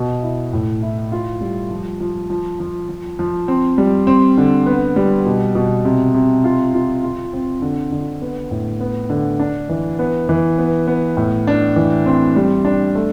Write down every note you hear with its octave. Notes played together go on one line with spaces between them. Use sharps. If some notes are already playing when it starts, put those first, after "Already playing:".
Already playing: B2
E4
A2
E4
F4
G3
F3
F3
F3
F3
F3
F3
C4
G3
C4
D3
B3
G3
B2
B2
C3
C3
F4
F4
F4
C4
D3
D3
B3
A2
B3
D3
D4
E3
B3
E3
B3
B3
A2
D4
E3
C4
G3
D4
A3